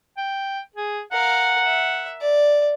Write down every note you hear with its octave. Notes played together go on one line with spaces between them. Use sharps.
G5
G#4
A#4 F5 F#5
E5
D5